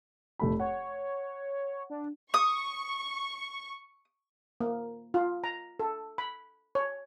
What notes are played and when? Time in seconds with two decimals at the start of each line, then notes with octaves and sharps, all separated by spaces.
0.39 F1 A3 B5
0.60 C#5 F#5
1.90 D4
2.34 C#6 D#6
4.61 A#3
5.14 F4
5.44 A#5
5.80 A4
6.18 B5
6.75 C#5